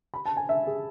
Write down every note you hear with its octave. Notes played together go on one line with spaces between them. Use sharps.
B5
A5
G#5
E5
G#4